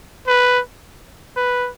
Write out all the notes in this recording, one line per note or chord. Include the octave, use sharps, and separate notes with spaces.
B4
B4